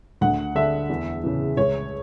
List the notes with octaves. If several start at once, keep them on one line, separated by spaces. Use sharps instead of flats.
D2 F#5
D3 E5
E2
C#3 E3
C#2 C#5